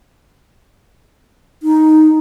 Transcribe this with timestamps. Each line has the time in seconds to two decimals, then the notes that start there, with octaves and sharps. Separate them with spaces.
1.63 D#4